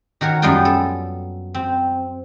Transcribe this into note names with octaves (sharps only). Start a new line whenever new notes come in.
D#3 F#4 A#4 C#5
F#2 G3 G#3 B3 F4 G5
A4
C4